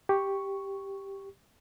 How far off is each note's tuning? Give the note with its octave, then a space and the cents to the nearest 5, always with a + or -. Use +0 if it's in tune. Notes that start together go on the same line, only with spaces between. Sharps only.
G4 +0 C#6 +0